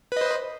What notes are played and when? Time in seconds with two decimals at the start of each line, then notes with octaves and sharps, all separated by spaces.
0.12 B4
0.17 D#5
0.21 C5